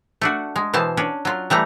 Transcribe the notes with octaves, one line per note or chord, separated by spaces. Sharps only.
A3 D4 F#4
G#3
B2 E3 C5 A5
C#4 D4
F#3 F4
E3 G3 A3 A#5